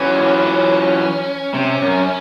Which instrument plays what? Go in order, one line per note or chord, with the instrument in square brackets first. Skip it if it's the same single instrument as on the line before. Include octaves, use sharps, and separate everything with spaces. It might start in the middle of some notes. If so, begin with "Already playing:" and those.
Already playing: [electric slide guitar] E3 F#3 [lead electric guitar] C#4
[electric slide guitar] C3 [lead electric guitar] C#4
[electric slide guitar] F#2